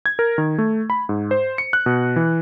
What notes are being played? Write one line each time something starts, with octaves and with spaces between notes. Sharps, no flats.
G#6
A#4
D#3
A3
B5
G#2
C5
C#7
F#6
B2
E3